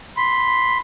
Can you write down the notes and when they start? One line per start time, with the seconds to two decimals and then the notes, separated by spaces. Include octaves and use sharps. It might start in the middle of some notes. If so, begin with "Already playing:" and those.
0.17 B5 C6